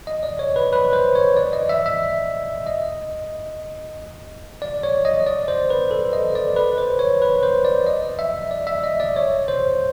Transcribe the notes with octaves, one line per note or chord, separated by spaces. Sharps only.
D#5
D5
C#5
B4
B4
C5
C#5
D5
D#5
E5
E5
D#5
D5
C#5
D#5
D5
C5
B4
A4
D#5
D5
B4
C5
C#5
B4
C5
D5
D#5
E5
D5
E5
D#5
D5
C#5
C5